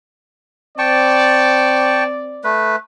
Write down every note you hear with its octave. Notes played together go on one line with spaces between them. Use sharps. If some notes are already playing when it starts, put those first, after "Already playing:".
C4 D5 G5 A5 C#6
A3 B4